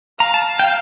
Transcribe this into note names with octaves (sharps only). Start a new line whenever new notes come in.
F5 A#5
A5
G5